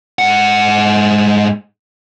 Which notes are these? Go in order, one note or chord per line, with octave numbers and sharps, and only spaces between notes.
G#2 F#5